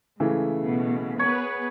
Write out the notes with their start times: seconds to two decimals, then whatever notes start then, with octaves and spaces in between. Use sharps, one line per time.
0.20 G#2 C#3 E3 A3
0.60 B2
1.19 B3 G#4 B4 C#5